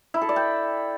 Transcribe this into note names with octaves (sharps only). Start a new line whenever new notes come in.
E4
A4
D5
G5